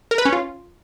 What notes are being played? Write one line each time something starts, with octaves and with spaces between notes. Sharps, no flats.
A#4
B4
C#4
F4